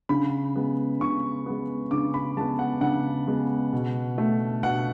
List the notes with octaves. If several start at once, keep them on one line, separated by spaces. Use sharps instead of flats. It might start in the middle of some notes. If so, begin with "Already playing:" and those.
C#3 B5
G#3 B3
C#3 C#6
G#3 B3
C#3 D6
B5
G#3 B3 A5
F#5
C#3 F#5
G#3 B3
B2
A3
B2 F#5